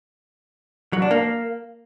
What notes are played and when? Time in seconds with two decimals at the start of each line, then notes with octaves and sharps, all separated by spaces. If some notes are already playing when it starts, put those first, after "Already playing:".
0.93 F#3
1.02 D4
1.11 A#3